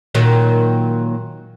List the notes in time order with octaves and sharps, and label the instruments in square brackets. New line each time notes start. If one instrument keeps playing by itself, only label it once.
[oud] A#2 D#3 F#3